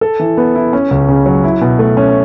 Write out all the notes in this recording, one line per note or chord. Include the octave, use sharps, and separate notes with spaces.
A4
E3
B3
E4
C#4
C#2
C#3
F#3
E4
B2
A3
C#4